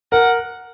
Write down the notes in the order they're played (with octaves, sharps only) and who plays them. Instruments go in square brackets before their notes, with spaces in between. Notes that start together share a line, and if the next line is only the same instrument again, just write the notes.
[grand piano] A#4 [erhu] F#5